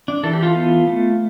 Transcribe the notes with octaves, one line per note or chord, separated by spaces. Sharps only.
D4
E3 A4
G4
F4 A4
B3
A3